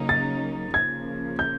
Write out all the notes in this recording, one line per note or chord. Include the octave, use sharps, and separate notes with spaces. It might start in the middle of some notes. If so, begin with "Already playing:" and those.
Already playing: C#3 F#3 A#3 D#4
A6
C#3 F3 A#3 G#6
G6